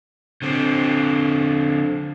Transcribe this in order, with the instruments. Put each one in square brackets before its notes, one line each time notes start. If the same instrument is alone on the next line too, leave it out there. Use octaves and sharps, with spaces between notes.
[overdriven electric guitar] D3 C4